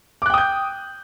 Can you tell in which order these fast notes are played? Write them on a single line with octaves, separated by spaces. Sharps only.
D6 F#6 G5 D#6 G6